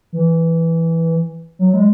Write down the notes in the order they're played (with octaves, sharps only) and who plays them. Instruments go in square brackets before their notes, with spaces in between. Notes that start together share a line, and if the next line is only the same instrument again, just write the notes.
[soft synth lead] E3
F#3
G#3